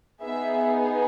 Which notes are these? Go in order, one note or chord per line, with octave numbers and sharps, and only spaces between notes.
B3 D#4 G#4 E5